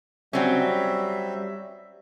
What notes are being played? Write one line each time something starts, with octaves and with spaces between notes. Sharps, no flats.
F#3 G3 C4 C#4 E5